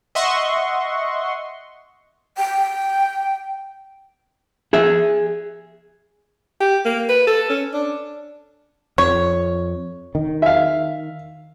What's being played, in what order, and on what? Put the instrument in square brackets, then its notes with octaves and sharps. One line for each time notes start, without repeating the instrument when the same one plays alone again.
[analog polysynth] D#5 E5 F#5 C6 C#6
[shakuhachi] G5
[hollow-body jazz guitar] G#4 E5
[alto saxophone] G4
A#3
B4
A4
C#4
D4
[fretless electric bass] F2 [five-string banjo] C#5
[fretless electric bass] D#3
[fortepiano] E5 F5